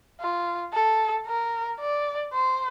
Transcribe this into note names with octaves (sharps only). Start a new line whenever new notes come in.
F4
A4
A#4
D5
C5